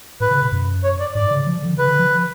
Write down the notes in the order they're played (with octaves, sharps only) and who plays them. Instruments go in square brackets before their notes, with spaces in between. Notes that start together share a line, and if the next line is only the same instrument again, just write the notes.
[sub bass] A2 [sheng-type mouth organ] B4
[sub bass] C#3
B2
F#2
[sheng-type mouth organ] C#5
D5
[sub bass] G#2 [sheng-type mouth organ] D5
[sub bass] C#3
F3
D3
[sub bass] C#3 [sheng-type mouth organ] B4
[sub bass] D3
F3